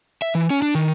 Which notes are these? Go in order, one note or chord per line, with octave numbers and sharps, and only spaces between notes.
E5
E3
C#4
D4
D#3